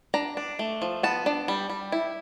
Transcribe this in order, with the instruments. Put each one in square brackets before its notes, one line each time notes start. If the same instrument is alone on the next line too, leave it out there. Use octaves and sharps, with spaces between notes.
[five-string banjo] D4 A#5
D4
A3
F3
B3 A5
D4
G3
G3
E4